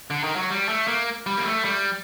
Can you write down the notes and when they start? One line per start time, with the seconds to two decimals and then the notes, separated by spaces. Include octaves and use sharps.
0.10 D3
0.24 D#3
0.36 F#3
0.50 G3
0.69 A3
0.88 A#3
1.26 G3
1.37 A#3
1.45 A3
1.65 G3